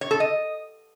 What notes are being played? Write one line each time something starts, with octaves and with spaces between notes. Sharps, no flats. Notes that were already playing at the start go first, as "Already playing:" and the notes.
C#5
A4
D#5